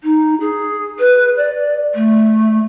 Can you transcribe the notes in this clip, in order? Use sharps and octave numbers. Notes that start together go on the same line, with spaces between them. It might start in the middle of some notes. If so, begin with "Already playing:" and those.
D#4
G#4
B4
D5
A3